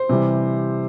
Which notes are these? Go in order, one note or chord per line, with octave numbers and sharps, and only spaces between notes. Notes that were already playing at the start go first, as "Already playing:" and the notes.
Already playing: C5
C3 E3 G3